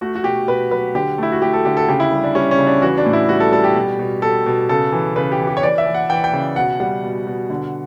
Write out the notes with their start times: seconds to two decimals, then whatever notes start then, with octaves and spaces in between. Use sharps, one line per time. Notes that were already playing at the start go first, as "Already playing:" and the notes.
0.01 A3 F#4
0.15 F#4
0.24 B2 G4
0.48 B2 B4
0.71 F#3 B4
0.95 D3 G4
1.18 A3 E4
1.32 F#4
1.42 A3 G4
1.53 A4
1.65 D3 G4
1.77 A4
1.88 C#3 G4
2.00 E4
2.12 G3
2.24 D4
2.35 G3 C#4
2.51 C#4
2.58 C#3
2.67 D4
2.82 E3 F#4
2.98 D4
3.06 A2
3.13 E4
3.29 G3 F#4
3.40 A4
3.52 G3 A4
3.64 G4
3.76 B2
3.99 B2
4.22 B2 A4
4.46 B2
4.69 C#3 A4
4.92 E3
5.16 C#3 B4
5.32 G4
5.40 E3
5.47 G4
5.57 C#5
5.63 E3 D5
5.78 E5
5.86 E3
5.94 F#5
6.10 E3 G5
6.24 G5
6.33 C#3
6.56 B2 F#5
6.80 G3 F#5
7.03 B2
7.27 B2
7.50 D3